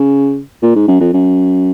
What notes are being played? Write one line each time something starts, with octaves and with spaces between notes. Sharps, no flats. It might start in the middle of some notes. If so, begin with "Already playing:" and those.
Already playing: C#3
A#2
G#2
F#2
F2
F#2